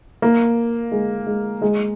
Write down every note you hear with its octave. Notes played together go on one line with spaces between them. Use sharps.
A#3
G#3
G#3
G#3